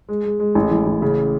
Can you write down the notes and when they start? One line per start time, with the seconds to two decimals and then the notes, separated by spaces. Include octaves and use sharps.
0.09 G#3
0.25 G#3
0.40 G#3
0.55 A1
0.71 E3
0.87 A1
1.02 C#3